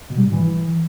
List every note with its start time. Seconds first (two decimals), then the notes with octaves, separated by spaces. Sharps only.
0.10 B2
0.18 G3
0.25 G#2
0.33 E3